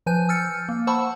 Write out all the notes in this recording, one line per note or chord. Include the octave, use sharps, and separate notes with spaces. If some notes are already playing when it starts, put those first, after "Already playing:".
F3 B4 G#5 G6 D#7
E6 F6 G6 A6 C#7
A#3
C5 F#5 A5 B5 C#6 E6